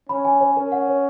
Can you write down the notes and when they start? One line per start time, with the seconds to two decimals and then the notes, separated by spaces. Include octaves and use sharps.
0.09 C#4 B5
0.25 G#5
0.41 C#5
0.57 C#4 A#4
0.72 F#5
0.88 C#5